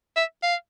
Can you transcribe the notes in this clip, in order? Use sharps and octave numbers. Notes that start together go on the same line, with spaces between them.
E5
F5